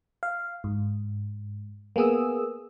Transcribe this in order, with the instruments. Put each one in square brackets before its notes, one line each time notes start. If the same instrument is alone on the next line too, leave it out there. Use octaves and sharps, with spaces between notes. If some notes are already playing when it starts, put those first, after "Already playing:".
[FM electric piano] F5
G#2
A#3 B3 G#4 D#6 E6